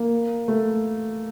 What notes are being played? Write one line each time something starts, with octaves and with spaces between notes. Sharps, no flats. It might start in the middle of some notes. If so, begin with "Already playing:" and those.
Already playing: A#3
A3